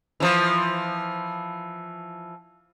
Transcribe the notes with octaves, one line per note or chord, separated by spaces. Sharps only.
E3 F3